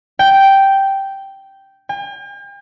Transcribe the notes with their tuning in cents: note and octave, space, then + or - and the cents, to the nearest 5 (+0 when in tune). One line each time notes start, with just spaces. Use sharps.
G5 -5
G5 +45